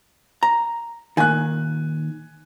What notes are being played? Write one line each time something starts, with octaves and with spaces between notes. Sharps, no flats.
A#5
A#2 D#3 G#5 F#6